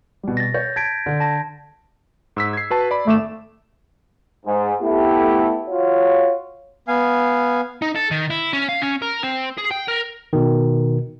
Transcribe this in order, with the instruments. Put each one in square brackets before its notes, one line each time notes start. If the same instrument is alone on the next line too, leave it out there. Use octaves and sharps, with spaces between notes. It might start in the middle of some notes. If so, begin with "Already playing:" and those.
[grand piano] B2 G3
[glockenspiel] A6 A#6
[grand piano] C#5 [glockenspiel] G6
[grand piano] A5 [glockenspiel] G#6 B6 D7
[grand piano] D3
[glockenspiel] A5 A#6
[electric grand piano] G#2 E6 B6
G#6 C7
F#4 B4 A5
D5 B5
[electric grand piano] G#1 D6 E7 [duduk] A3
[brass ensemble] G#2
A3 B3 E4 G4
F4 F#4 C#5
[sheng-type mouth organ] B3 F5 G#5
[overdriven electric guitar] D#4
A4
D#3
E4
C#4
F5
C#4
A#4
C4
G#4
G5
A#4
[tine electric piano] B2 D#3